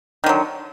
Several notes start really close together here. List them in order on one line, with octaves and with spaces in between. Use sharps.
D#3 D3 F#3